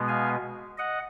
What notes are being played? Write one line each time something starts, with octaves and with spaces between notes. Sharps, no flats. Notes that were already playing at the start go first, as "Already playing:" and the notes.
Already playing: B2 G#3 B3
F5 G#5
D#5 F#5